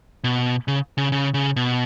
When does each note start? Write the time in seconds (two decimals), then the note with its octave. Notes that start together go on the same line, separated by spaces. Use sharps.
0.24 B2
0.68 C#3
0.98 C#3
1.12 C#3
1.34 C#3
1.56 B2